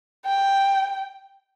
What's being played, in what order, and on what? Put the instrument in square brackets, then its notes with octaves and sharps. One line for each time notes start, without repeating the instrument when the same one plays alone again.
[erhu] G5